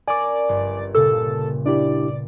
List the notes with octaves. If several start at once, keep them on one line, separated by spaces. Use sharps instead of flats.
C#4 A#4 D5 G#5 D6
G1
A#2 C#3 A4 E6
D4 E4 G4 D5